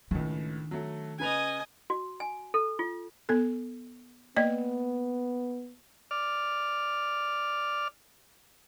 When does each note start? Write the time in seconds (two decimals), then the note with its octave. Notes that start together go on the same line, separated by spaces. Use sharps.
0.11 C#2 A2 D#3 D4
0.71 F#3 A3
1.20 C#3 B4 D#5 G#5 F7
1.90 F#4
2.20 G#5
2.54 A4
2.79 F4
3.29 B3 A4
4.36 A#3 B3 D5 D#5
6.11 D5 F6